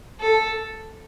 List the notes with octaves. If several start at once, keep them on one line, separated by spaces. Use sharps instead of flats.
A4